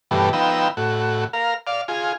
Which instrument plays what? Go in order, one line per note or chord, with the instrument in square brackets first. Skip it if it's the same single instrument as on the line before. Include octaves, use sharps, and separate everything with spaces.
[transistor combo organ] G2 B2 E3 G3 A3
F3 B3 D#4 G5 E6
A2 F#4
A#4 F5
D5 F5
F4 G#4